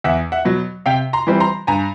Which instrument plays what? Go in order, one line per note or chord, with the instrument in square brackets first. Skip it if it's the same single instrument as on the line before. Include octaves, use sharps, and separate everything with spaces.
[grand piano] E2 E5 F#5
E5 F#5
B2 F#3
C3 F5 G5
A#5 C6
E3 G3 C4
A#5 C6
G2 G#5 A#5